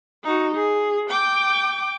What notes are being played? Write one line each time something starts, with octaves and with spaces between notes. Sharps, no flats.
D#4 F#4
G#4
G5 D6